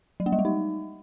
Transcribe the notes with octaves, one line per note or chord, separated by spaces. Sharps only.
F#3
A#3
G3
G#3
D#4